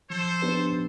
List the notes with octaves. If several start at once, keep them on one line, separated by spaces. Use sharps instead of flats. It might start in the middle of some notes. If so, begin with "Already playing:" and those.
F3 A4 C5
B3 D4 G4 B4